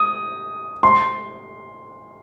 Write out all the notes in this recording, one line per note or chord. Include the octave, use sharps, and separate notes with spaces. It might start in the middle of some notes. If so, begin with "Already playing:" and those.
Already playing: D#6
C6